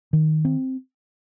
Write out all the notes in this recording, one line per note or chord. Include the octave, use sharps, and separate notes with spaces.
D#3
C4